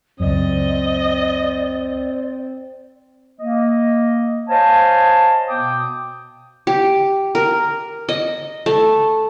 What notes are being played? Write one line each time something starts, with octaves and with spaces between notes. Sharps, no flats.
C#2 F#2 C4 D5 D#5
A#3 D#5
C5 C#5 D#5 F5 G#5 A5
B2 B3 G5 D6 D#6
G4
A#4
D#5
A3